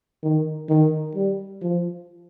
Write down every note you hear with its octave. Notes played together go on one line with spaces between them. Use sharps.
D#3
D#3
G3
F3